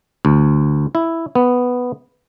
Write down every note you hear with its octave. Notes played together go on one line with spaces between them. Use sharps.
D2
E4
B3